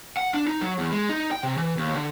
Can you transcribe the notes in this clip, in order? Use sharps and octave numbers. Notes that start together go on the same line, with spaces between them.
F#5
D4
D#4
F#3
E2
G#3
D#4
G5
C3
E3
D#2
D3